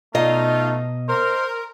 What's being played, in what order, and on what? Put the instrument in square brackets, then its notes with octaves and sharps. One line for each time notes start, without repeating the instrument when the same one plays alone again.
[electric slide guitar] B2 F5 A#5 [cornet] A3 [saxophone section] D#4 F4 [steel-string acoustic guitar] D#5
[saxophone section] A#4 [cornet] C5